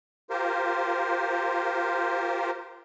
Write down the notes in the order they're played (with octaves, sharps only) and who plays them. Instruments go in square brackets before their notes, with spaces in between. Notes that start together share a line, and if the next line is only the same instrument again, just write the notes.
[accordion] F4 G4 A#4 C5